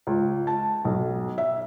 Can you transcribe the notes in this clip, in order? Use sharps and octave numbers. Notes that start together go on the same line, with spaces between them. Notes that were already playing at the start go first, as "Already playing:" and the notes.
C#2
A5
B1
E5